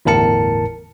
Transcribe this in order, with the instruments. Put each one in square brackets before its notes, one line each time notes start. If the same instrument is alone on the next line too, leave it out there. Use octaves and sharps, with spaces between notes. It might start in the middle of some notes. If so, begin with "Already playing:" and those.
[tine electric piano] G1 E2 A2 A#4 A5 C#7